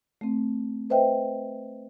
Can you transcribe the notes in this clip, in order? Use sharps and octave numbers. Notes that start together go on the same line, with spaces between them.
A3 C4
B4 C5 D#5 E5 G5